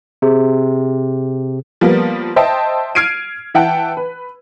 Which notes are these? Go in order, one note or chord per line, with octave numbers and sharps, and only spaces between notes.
C3 G#4
F3 G3 A#3 B3
C5 D#5 E5 G5 A5
F6 G#6 C7 D7 D#7
E3 E5 F#5 G5 A5
B4